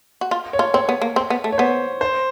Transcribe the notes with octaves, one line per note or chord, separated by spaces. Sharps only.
F#4
F4
C#5
F4
C4 C#5
B3
A#3
C4
B3
A3
C#5
B3 C5
C5